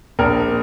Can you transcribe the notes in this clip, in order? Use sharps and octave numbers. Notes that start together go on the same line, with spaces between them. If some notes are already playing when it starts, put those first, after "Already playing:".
A#1 A#4